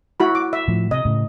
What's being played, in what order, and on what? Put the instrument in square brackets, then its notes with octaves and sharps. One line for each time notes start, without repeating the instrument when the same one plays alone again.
[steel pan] E4 F#4 B5
D6
E5
[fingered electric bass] A2 F3
[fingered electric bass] C3 [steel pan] D#5
[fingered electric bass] A2 C#3